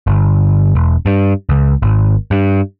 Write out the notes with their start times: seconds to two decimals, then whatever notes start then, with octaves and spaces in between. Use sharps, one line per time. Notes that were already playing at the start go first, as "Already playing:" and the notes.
0.07 G1
0.75 E1
1.06 G2
1.49 C#2
1.82 G#1
2.31 G2